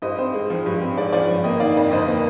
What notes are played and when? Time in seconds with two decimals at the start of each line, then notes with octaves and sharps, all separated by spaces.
0.02 G2 C5 D#5
0.18 C4 C5
0.34 G#3
0.50 F3
0.66 G2
0.81 C4
0.97 G#3 D5
1.12 F3 D5
1.28 G1
1.44 A#3 D#5 G5
1.60 D#3 D5 F5
1.76 F2
1.92 G1 C5 D#5
2.07 A#3